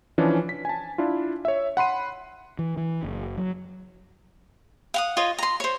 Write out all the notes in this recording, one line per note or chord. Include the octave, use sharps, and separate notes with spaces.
E3 F3 C#4 D4
B6
G#5 A5
D4 E4 F4
C#5 E5
F#5 B5 C6 D#7
E3
E3
F#1
F#3
F5 F#5 D#6
F4 C#5 D#5
A#5 C6
C5 C#5